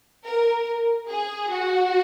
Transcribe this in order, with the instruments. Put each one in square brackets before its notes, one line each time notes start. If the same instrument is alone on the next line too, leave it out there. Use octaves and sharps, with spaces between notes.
[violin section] A#4
G#4
F#4